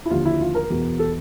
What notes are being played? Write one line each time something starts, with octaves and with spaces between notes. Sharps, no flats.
E4
D#2 D3 F3 F4
E4
F4
A#4
E2 B2
A4